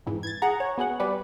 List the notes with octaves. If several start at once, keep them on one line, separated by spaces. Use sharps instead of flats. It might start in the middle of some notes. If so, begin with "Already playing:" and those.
F2 G#2 E3
G#6 A6
G#4 F#5 A#5
C#5
B3 F#4 G#4 F#5
G3 B4 D5